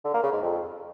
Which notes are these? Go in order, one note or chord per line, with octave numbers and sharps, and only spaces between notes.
D3
A#3
C#3
G#2
F2